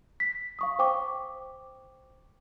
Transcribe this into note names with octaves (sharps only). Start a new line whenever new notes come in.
B6
F5 C#6 D#6
C5 G5 C#6 D6